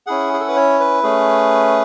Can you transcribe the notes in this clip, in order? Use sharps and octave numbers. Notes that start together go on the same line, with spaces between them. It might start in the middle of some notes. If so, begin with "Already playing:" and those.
C#4 E4 G#4 F#5
G#4
A4
B4
C#5
B4
A3 C#4 G#4